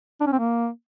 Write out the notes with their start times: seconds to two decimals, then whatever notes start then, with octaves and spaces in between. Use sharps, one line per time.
0.20 D4
0.27 C#4
0.33 C4
0.39 A#3